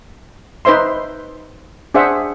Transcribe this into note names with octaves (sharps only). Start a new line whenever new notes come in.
D#4 B4 C5 E5 C6
D4 G#4 C5 E5 F#5